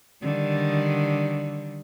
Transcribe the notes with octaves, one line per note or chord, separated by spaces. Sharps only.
D3 D#3 G3